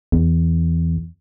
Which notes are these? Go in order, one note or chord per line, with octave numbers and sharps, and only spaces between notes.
E2